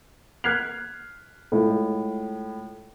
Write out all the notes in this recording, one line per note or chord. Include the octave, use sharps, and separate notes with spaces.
F6 F#6 G#6 B6 C7 F7
A2 G#3 E4 F4